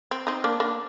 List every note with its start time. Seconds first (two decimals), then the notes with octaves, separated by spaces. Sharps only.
0.11 C4
0.27 C4 D#4
0.44 A#3 D4
0.60 A#3 D4